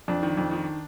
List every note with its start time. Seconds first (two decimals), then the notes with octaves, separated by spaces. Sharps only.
0.08 F2 D4
0.23 D#3
0.37 F2
0.51 D#3